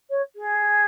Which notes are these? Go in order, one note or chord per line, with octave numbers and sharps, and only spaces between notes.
C#5
G#4